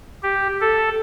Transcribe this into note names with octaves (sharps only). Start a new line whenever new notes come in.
G4
A4